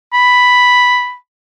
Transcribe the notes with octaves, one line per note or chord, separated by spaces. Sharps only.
B5